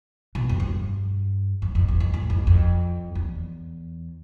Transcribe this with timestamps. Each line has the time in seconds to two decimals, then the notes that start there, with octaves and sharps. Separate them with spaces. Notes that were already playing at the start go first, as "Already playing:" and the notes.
0.35 B2
0.49 F2
0.60 G2
1.62 F2
1.75 F2
1.88 E2
2.00 F2
2.14 A2
2.30 F2
2.47 F2
3.15 E2